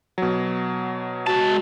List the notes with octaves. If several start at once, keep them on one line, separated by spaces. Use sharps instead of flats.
B2 F#3
G#3 F#4 A5